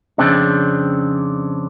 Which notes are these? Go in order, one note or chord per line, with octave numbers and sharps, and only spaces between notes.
F2 C#3 C4 D4